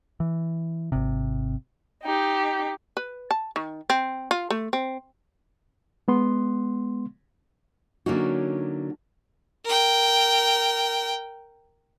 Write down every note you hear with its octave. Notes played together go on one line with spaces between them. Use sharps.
E3
G#1 C3
D#4 G4
B4
A5
D#3
C4
F4
A3
C4
G#3 B3 C6
D3 F#3 A#3 C#4 D#4 F#4
A#4 G5